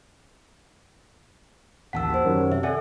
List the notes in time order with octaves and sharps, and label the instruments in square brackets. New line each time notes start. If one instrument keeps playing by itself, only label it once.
[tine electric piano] A1 D#2 B6 [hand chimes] F#5 A5 E6
[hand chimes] G4 C5
[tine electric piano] F#2 D#3 F#3
[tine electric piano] C3 [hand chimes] E5
[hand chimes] A4 E5 [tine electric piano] D5 F#5 G#5